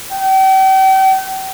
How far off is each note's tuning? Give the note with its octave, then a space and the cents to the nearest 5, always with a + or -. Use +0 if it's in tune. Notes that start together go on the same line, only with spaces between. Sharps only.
G5 -40